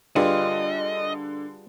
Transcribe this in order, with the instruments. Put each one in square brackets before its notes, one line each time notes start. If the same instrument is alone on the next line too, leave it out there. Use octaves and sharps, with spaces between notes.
[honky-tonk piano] D3 [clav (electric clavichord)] G3 [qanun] F4 G#4 B4 [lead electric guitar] D#5